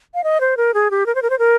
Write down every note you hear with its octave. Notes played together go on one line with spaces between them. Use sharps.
F5
D#5
C5
A#4
G#4
G4
A#4
C5
A#4
C5
A#4